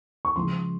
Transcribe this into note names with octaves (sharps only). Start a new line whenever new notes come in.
C#6
C#3 F3 G#3 C6